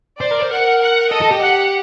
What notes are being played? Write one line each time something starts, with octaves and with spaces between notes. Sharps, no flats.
C5 D5
A#4
C5
A#4 F#5
F#5
A4 D#5
A4
G4
F#5